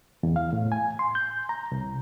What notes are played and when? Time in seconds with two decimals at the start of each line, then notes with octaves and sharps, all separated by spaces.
0.23 E2
0.36 F5
0.53 A2
0.72 G#5
0.99 C6
1.15 G6
1.49 A#5
1.72 C2